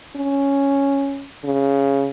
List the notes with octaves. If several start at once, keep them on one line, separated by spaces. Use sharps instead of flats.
C#4
C#3